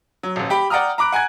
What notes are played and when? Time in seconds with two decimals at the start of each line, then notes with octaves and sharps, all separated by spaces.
0.23 F#3
0.36 D#1 A1
0.50 G4 G5 B5
0.70 D5 F#5 G5 A#5 D#6 F6
0.98 A#5 B5 D6 F#6 D7
1.12 F#5 G#5 A#5 F#6 G#6